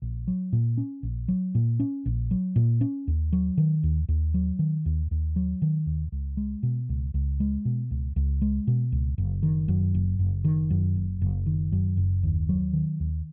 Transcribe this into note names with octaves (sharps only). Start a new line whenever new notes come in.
A#1
F#3
A#2
C#4
A#1
F#3
A#2
C#4
A#1
F#3
A#2
C#4
D#2
F#3
D#3
D#2
D#2
F#3
D#3
D#2
D#2
F#3
D#3
D#2
C#2
G#3
B2
C#2
C#2
G#3
B2
C#2
C#2
G#3
B2
C#2
F#1
D#3
F#2
F#1
F#1
D#3
F#2
F#1
F#1
D#3
F#2
F#1
D#2
F#3
D#3
D#2